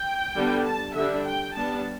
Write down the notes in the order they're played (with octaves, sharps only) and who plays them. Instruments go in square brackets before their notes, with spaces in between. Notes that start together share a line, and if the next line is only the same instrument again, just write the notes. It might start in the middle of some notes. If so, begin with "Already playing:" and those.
Already playing: [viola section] G5
D3 G3 B3 D4
A5
D3 G3 D4 E5
G5
G3 B3 D4 A5